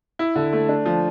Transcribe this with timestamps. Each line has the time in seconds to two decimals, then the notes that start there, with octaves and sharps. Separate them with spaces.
0.19 E4
0.36 D3
0.53 A3
0.69 D4
0.86 F3